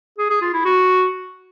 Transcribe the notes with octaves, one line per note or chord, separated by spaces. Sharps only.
G#4
G#4
F4
E4
F#4